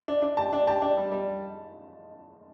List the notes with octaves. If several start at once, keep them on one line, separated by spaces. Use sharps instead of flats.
D4
D4
G4 A5
D4
G4 A5
D4
G3
G3